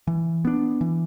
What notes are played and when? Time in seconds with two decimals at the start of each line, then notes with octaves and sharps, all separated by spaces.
0.07 E3
0.45 B3 D4
0.81 E3